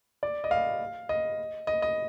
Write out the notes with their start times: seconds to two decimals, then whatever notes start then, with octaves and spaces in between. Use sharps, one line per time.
0.23 D5
0.44 D#5
0.51 F5
1.09 D#5
1.67 D#5
1.82 D#5